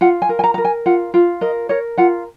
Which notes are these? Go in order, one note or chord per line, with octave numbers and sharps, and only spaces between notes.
F4 F#5
G#5
A#4
G#5
A#5
A#4 A#5
G#5
F4 F#5
F4
A#4 D#5
A#4 C#5
F4 F#5